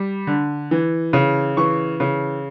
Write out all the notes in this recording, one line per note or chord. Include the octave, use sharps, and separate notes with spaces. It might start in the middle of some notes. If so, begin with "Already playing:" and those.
Already playing: G3
D3
E3
C#3
E3 C#6
C#3